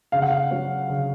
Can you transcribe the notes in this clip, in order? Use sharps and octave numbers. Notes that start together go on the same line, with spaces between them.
C#3 F5
F#5
F5
F#3 C#4
C#3